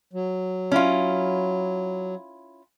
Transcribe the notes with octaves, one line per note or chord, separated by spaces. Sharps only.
F#3
C#4 E4 F4